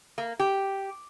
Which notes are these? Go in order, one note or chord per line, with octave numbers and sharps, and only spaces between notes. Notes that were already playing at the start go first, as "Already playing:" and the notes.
A#3
G4